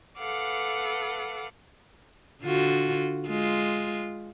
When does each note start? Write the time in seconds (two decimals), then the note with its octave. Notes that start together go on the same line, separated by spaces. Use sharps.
0.18 A4 B4 F5 F#5 D6
2.43 D3 F4 F#4
3.28 G#3 F4